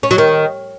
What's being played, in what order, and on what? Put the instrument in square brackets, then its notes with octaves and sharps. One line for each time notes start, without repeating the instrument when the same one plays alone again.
[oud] C#4
F#3
D#3